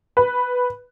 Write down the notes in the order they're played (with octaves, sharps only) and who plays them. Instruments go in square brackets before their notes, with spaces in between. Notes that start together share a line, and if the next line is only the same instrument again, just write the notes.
[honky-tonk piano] B4